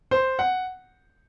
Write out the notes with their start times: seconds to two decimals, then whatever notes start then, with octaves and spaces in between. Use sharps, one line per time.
0.11 C5
0.39 F#5